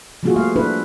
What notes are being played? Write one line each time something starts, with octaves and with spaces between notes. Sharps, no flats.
F3 G3 A#3 F4 F#4 G#4
A3 F5
D4 E4 B4